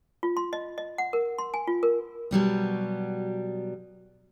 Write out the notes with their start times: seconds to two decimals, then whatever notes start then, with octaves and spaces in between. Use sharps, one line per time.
0.23 F4
0.37 C6
0.53 D#5
0.78 D#5
0.98 F#5
1.13 A#4
1.38 C6
1.54 G#5
1.67 F4
1.83 A#4
2.31 B2 F#3 G3 B3